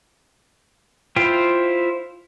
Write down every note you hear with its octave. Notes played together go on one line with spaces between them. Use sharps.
E4 F4 C5 G5